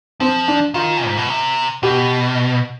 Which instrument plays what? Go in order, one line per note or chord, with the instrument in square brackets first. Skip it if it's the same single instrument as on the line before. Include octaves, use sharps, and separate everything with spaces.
[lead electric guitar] F3 [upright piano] C4
[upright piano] D4
[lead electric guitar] D#3 [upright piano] F4
[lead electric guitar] G#2
B2
C3
[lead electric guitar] B2 [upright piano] G4